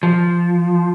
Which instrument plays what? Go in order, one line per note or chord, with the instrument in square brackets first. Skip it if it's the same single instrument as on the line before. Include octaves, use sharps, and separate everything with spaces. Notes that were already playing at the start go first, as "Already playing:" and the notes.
[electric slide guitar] F3